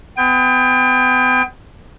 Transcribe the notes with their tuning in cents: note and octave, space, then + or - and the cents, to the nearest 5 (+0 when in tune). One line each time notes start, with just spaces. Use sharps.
B3 +35 G5 +30